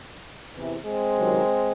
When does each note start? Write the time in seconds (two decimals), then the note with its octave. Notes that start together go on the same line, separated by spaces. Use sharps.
0.55 E2 C3 E3
0.86 G#3 C4
1.19 C#2 C3 D#3 F#3